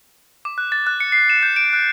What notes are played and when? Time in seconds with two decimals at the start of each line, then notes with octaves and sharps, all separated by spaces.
0.45 D6
0.58 F#6
0.72 A6
0.87 F#6
1.00 C#7
1.12 C7
1.30 E7
1.43 G6
1.56 D7
1.73 F#6